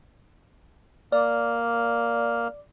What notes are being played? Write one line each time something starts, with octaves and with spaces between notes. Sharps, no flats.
A#3 D5 F6